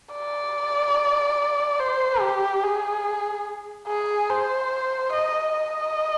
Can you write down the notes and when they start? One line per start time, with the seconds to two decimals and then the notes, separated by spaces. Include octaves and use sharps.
0.14 D5
1.80 C5
2.21 G4
2.63 G#4
3.87 G#4
4.30 C5
5.12 D#5
5.54 D#5